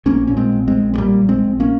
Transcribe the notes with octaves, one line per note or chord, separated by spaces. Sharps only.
A#1 A#3 C#4
A#2 C#4
G#3 C4
A#1
G#3 C4
A#1
G#3
A#2 G3 A#3
A#1
G#3 C4
A#1
A#3 C#4